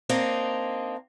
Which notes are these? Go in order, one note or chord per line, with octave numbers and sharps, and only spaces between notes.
A#3 C4 D4 D#4